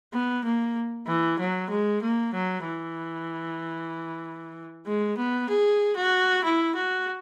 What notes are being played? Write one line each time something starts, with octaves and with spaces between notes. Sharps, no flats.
B3
A#3
E3
F#3
G#3
A#3
F#3
E3
G#3
B3
G#4
F#4
E4
F#4